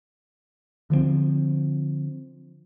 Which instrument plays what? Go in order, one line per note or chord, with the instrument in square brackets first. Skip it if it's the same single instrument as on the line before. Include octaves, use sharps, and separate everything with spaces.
[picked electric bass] D3 F3 G3 C4